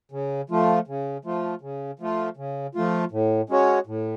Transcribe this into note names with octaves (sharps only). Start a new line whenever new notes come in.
C#3
F3 A3 F4
C#3
F3 A3 F4
C#3
F3 A3 F4
C#3
F3 A3 F4
A2
G#3 C#4 F#4 C#5
A2